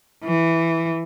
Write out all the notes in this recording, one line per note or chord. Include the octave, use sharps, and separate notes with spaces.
E3